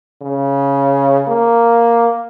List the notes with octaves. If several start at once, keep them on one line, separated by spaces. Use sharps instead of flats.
C#3
A#3